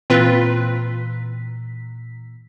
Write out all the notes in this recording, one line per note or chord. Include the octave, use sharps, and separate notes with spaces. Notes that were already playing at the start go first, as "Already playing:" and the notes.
A#2 E3 C4 F4 B4 B6